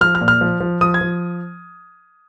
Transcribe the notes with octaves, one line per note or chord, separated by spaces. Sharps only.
F3 F6
F6
A#2
F6
F3
F3
F3 D#6
G#6
F3